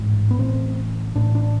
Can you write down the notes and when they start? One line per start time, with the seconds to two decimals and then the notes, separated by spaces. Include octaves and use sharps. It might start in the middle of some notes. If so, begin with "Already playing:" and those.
Already playing: A1 G#2
0.31 B3
0.39 A1 A2 C4
1.15 A1 A2 D4
1.35 D4